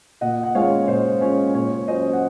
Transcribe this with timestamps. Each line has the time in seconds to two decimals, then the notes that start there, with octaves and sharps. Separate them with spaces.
0.21 A#2 D#5 F#5
0.43 F#5
0.55 G#3 C#4 F4 C#5 F5
0.88 A#2 C5 D#5
1.21 G#3 C#4 F4 C#5
1.54 A#2 C#5
1.88 F#3 C#4 F4 C5 D#5
2.13 F#5